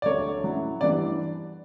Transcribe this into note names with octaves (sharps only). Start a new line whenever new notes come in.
D5
D2 D3 F#3 A3 C#5
A2 F#3 C#4 E4
G2 E3 B3 D4 D5